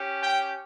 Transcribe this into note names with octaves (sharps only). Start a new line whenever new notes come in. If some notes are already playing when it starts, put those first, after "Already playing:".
Already playing: C#4 G4
G5